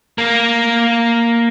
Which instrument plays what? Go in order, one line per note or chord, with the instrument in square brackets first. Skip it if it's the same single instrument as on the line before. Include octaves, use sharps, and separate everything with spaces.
[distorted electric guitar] A#3 A#4